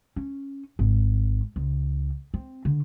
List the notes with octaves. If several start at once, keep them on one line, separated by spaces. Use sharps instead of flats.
C#4
G#1
C#2
C4
D3